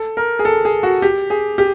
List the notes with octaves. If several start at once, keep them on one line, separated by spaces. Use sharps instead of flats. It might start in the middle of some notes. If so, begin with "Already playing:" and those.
Already playing: A4
A#4
G#4
A4
G#4
F#4
G4
G#4
G4